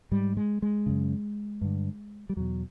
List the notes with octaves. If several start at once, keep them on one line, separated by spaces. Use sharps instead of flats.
G#2 G3
G#3
G#3
F#2 C#3
G2 D3
G3
E2 B2 F#3